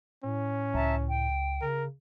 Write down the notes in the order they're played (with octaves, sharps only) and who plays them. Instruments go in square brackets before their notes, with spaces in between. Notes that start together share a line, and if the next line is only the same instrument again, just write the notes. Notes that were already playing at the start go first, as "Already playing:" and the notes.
[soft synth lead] A2 [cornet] C#4
[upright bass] C#2 [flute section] E5 A5 A#5
[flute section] G5
[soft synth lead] C#3 [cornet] A#4